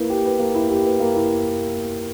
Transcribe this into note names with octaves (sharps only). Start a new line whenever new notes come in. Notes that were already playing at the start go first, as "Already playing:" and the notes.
Already playing: A#3 E4 B4
G4
B4
A#3
E4
G4
B4
A#3
E4